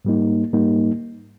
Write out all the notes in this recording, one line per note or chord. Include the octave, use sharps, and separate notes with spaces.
G#2 G3 A#3 D#4
G#2 G3 A#3 D#4